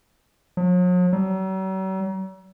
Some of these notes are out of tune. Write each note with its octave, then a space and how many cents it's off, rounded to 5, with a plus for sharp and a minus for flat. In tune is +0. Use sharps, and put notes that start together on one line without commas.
F#3 -45
F#3 +45